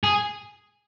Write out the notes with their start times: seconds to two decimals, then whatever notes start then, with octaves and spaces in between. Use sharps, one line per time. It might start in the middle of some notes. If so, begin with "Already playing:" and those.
0.04 G#4